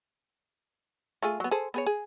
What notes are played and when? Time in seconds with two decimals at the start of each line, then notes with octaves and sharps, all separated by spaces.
1.22 A3 F4 G#4
1.40 F#3 B3
1.51 G#4 A4 C5
1.74 B3 G#4 C#5
1.86 G#4